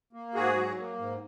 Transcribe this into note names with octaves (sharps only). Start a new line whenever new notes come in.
A#3
G#2 F#4 G#4
F#3
A#3
G#2